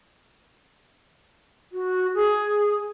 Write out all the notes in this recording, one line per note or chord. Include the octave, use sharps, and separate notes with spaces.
F#4
G#4